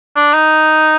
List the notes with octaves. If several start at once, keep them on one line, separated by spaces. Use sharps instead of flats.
D4
D#4